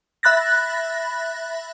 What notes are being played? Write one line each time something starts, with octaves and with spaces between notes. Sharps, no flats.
E5 B5 F#6 A6 A#6